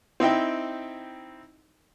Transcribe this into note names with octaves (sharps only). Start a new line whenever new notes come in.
C4 D#4 E4 G5